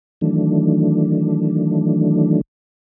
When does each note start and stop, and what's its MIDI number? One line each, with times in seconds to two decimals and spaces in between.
0.21 2.41 51
0.21 2.41 52
0.21 2.41 54
0.21 2.41 57
0.21 2.41 62